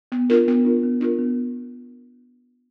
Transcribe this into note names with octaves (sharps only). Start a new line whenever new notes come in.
B3
D4 F4 A#4
B3
D4 F4 A#4
B3
D4 F4 A#4
B3